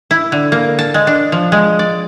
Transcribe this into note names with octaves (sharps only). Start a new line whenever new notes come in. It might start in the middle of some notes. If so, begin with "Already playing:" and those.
E4
D3
A#3
A5
G#3
D4
F3
G#3
D5